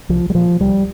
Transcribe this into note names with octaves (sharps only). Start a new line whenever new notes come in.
C2 F3
G3
A#2 F3
C2 G3